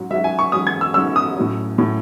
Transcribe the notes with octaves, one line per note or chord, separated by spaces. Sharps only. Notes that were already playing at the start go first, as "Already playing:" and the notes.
Already playing: G#2 F#3 C#4
G#2 F#3 C#4 E5
G#5
C#6
G#2 F#3 C#4 D#6
G#6
E6
G#2 F#3 C#4 E6
D#6
A2 F#3 C#4
A2 F#3 C#4